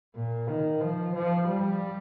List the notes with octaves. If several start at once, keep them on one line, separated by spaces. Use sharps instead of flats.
A#2
D#3
F3
F3
G3